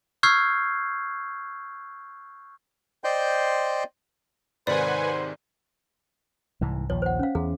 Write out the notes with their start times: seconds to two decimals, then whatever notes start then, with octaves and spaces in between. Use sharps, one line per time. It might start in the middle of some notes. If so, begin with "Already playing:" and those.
0.23 C#6 E6 F6 G6 G#6 C7
3.04 C5 D5 D#5 G5 C6 G6
4.67 G#2 C3 D#3 B4 C5 D5 F#5 G#5
6.61 C2 G#2 E3
6.90 A#1 D#2 F3 C#5
7.02 C5 F#5
7.19 C#4 F5
7.35 E2 G#4